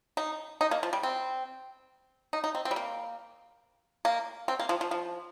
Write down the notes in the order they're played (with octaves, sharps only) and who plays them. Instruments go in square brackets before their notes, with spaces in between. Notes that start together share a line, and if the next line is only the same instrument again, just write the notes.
[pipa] D#4
D#4
A#3
F3
G3
C4
D#4
D#4
C4
C4
G3
A#3
A#3
C4
A#3
F3
F3
F3